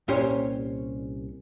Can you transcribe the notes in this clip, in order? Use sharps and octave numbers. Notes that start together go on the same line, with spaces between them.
C2 A#2 C#4 G4 C5 C#5